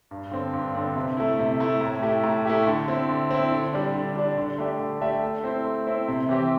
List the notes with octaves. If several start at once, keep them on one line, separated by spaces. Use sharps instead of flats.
G2
D3 C4
G2
D3 C4
C3
A3 E4
C3
A3 E4
A2
A3 E4 G4
A2
A3 E4 G4
D3
C4 E4
D3
C4 E4
D3
G3 D4
D3
G3 D4
D3
A3 D4 G4 E5
D3
A3 D4 G4 E5
A3
C4 E4 C5
A3
C4 E4 C5
C3
E3 C4 G4